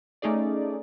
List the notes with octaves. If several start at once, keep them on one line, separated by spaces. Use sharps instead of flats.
A3 C#4 D#4 G#4 D5